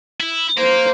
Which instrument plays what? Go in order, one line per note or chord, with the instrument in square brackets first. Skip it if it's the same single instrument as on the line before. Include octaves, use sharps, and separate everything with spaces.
[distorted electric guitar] E4
[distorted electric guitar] A#3 [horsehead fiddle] C5